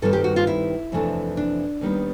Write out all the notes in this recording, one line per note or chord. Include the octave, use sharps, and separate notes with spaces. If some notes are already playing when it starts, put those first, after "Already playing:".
G2 D#3 G3 C4 A4
G4
F#4
F4
E4
F2 C3 E3 A3 D4
D4
D#2 D#3 G3 B3